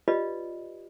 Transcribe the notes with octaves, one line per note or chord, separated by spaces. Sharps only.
F4 G4 B4 D5 D#5